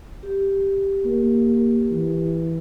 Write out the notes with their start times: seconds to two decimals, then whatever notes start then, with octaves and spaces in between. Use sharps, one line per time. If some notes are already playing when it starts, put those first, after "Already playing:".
0.23 G4
1.05 A#3
1.91 E3